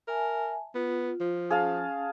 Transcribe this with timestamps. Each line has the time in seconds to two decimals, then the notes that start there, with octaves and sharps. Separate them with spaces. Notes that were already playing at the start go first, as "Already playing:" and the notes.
0.08 A#4 E5 G#5 A5
0.75 B3 F4
1.20 F3
1.50 C#4 G#4 F5 A5